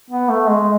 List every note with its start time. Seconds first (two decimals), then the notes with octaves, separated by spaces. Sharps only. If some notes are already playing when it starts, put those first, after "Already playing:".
0.10 B3
0.29 A3
0.49 G#3